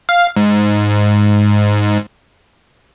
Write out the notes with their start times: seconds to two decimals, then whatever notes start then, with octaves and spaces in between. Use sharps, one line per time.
0.09 F5
0.37 G#2